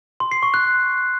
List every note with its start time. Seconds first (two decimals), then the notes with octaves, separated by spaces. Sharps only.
0.20 C6
0.31 C7
0.43 C#6
0.54 F#6